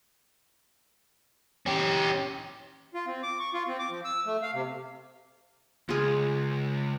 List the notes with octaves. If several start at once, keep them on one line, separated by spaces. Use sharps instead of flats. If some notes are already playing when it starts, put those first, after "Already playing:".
C#4 G4
F4
C4
D6
C#6
F4
C4
D6
F3
E6
A3
F5
C3
C#2 F4 G#4